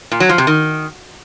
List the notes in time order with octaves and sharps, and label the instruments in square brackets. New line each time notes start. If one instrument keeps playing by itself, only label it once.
[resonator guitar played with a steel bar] A#2
F#3
F3
C3
D#3